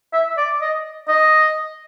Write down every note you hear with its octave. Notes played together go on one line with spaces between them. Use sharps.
E5
D5
D#5
D#5